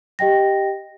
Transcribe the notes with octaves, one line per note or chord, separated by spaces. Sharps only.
G4 D#5 G5 A#6